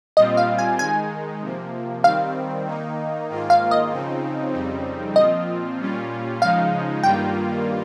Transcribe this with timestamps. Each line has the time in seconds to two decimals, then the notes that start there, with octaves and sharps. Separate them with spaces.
0.17 A#2 G3 C4 F4 D#5
0.37 F5
0.58 G#5
0.79 D#3 G#3 D#4 G#5
1.42 C3 F3 A#3
2.04 D#3 G3 C4 F5
2.66 D#3 A#3 D#4
3.29 G#2 D#3 A#3 F4
3.50 F5
3.71 D#5
3.91 C#3 F3 C4 D#4
4.54 F2 C#3 G3 C4 D#4
5.16 A#2 F3 C4 F4 D#5
5.79 A#2 G3 C#4 F4
6.41 C#3 F3 G#3 D#4 F5
7.03 G2 D#3 G3 A#3 F4 G5